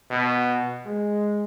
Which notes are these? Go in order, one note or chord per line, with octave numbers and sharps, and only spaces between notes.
B2
G#3